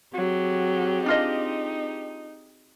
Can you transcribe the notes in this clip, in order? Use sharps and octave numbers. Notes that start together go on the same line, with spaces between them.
F#3 C4 G4 G#4
D4 D#4 F4 D#5